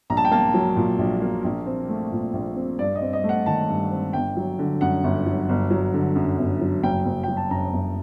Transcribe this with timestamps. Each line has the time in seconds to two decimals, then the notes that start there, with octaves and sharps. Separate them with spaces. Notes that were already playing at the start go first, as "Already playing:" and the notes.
0.10 A#1 A#5
0.17 A5
0.25 G5
0.32 A#3 A5
0.54 F#3
0.76 A#2
0.99 A#1
1.22 A#3
1.44 A#1
1.66 C4
1.89 A3
2.12 A#2
2.33 A#1
2.56 C4
2.79 G2 D5
2.96 D#5
3.02 C4
3.13 D#5
3.24 A3
3.29 F#5
3.46 D#3 A5
3.68 G2
3.91 C4
4.13 G1 G5
4.37 F#3
4.59 D3
4.81 F#2 F#5
5.04 G1
5.26 F#3
5.49 G1
5.71 F#3
5.94 D3
6.16 F#2
6.38 G1
6.61 F#3
6.83 F#1 G5
7.05 F#1
7.23 F#3 G5
7.37 A5
7.51 F#2 A#5
7.73 F#1